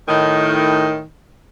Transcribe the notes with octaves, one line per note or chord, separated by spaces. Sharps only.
A2 D#3